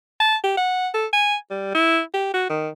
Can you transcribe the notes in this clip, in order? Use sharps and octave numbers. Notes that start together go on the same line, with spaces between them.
A5
G4
F#5
A4
G#5
G3
E4
G4
F#4
D#3